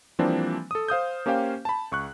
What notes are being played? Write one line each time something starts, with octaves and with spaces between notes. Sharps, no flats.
E3 F3 G3 A#3 C4 D4
A4 D#6
C5 F5 D#6 G6
A#3 C#4 G4 C5 F5 G5
A5 B5
C#2 C#6 F#6